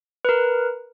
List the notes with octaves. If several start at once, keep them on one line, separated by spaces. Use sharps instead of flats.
A#4 B4